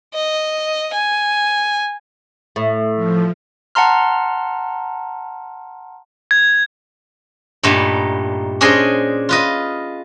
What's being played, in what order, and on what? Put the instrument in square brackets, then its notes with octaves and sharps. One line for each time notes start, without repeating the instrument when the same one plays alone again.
[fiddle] D#5
G#5
[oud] A2
[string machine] F3
[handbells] F#5 A5 A#5 C6 F6
[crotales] G#6
[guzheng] G2 A#2 A3 B3 D#4
C#4 D4 G#4 C5 D#5 C6
F4 B4 D#5